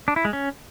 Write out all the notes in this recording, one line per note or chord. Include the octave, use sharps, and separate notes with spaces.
D4
E4
G#3
C#4